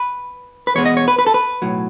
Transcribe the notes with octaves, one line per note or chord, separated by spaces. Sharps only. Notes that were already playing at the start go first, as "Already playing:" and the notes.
Already playing: B4
B4
E2 B2 G#3 B3 C#5
D#5
C#5
B4
B4
A4
B4
B1 A2 F#3